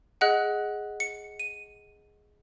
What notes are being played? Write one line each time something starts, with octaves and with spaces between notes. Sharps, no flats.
G#4 D#5 F#5 F#6
C#7
D#7